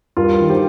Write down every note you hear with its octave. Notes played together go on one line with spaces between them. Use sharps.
G2 F4 A#4
D#3
G4 C5